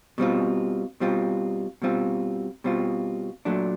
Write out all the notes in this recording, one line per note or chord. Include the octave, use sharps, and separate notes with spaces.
B2 G3 C4 F4
B2 G3 C4 F4
B2 G3 C4 F4
B2 G3 C4 F4
A#2 F#3 A3 D4